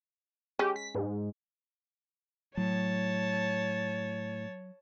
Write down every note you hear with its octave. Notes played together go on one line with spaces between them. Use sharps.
G#3 C#4 G4
B6
G#2
A2 F#3 C#5 A5